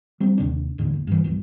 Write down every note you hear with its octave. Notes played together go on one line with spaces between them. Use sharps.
G3 C4
D#2 C3 D4
D#1 E2 A2 D3
F#1
G2 E3
A#1 E2 G2